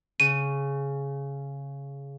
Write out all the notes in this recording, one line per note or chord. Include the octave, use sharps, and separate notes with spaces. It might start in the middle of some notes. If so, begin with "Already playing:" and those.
C#3 D#7